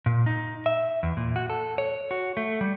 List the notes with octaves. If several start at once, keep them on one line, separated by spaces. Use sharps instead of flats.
A#2
D#4
E5
E2
A#2
F#4
A4
C#5
F#4
A3
G3